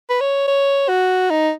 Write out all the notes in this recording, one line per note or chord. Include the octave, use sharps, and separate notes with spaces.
B4
C#5
C#5
F#4
D#4